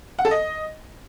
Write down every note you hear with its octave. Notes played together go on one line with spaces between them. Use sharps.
F#5
A4
D#5